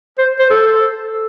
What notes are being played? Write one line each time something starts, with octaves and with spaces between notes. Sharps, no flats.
C5
C5
A4